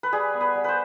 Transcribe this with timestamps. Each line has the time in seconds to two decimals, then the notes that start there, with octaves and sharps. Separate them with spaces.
0.03 B4
0.12 G3 G#4
0.34 B3
0.41 B4
0.55 G3
0.64 B4 C5